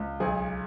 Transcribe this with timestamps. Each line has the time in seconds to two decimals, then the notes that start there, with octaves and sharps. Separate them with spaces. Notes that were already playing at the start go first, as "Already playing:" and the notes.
Already playing: C#2
0.20 B1 G#4